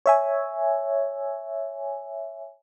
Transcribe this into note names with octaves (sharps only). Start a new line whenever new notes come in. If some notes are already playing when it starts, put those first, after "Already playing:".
C#5 E5 G#5